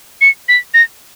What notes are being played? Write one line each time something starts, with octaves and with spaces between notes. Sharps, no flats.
C#7
B6
A#6